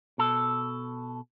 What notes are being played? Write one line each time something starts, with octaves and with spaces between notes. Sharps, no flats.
B2 A4